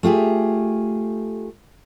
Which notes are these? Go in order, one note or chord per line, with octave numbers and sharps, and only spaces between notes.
A3 F4 G4 G#4